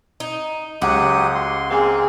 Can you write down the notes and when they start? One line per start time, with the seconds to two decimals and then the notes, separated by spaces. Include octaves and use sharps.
0.20 D#4
0.82 C#2 F#3 F#4 G4 D#6
1.34 C6
1.70 A#3 C4 G#4